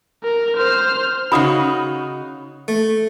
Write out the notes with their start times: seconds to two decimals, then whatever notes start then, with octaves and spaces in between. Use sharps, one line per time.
0.24 A#4
0.57 C5 F6
1.32 C#3 D#4 F#4 B5 D#6
2.68 A3